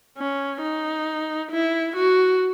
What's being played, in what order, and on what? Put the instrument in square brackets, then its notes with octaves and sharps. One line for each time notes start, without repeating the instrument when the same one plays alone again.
[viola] C#4
D#4
E4
F#4